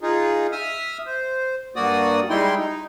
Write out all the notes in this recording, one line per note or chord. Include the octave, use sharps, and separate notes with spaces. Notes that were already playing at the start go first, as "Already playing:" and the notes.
D#4 F4 G#4
E5 D#6 F6
C5
G2 A#3 F#4 D5 D#6
G3 G#3 D#4 E4 G5 C6
D#4